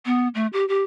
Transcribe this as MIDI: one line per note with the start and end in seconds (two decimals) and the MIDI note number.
0.06 0.28 59
0.35 0.47 57
0.53 0.67 67
0.68 0.83 67